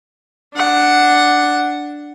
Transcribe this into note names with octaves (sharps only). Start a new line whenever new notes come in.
D4 F#5